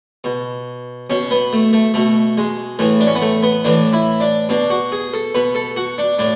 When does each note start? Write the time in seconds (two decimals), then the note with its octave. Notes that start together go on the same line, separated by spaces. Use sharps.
0.24 B2
1.10 B2 C#4
1.31 B3
1.53 A3
1.73 A3
1.94 B2 A3
2.38 G#3
2.79 A2 E3 A3
3.00 D4
3.07 C#4
3.15 B3
3.22 A3
3.43 B3
3.64 A2 E3 D4
3.93 E4
4.20 D4
4.49 B2 D4
4.70 F#4
4.92 G#4
5.14 A4
5.35 B2 B4
5.55 A4
5.77 F#4
5.98 D4
6.19 A2 D4